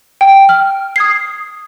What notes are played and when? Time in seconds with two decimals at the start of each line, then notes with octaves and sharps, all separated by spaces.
0.21 G5
0.49 F6
0.96 D#6 G#6 C7